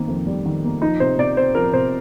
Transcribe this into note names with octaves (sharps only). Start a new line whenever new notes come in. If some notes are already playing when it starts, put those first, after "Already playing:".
Already playing: D#3 A#3 C4
F2
G3
D#3
A#3
F3 D#4
C3 C5
C3 D5
C4 C5
F3 A#4
C3 C5